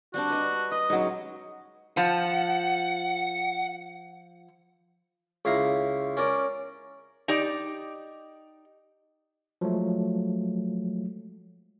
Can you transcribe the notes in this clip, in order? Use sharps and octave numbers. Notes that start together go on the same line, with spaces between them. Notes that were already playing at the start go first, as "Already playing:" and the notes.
G3 C4 D4 F#4
B4 D#5
B4 D#5
F#3 G#3 C#4 D#4
F3 F#5
C#2 E4 F5 A#5
C#4 A#4 D5
D#4 G4 D5
F3 F#3 G#3 A3